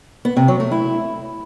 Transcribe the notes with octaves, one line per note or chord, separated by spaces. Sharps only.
B3
C3
F#3
A3
E4